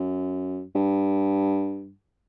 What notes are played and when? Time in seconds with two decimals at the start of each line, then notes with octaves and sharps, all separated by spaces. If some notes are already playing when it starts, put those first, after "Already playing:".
Already playing: F#2
0.75 G2